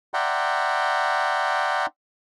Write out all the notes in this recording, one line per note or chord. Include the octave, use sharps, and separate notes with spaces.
D5 E5 F#5 G5 A#5 C6